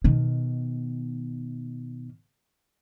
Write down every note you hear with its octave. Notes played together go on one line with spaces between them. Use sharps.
B2 D#3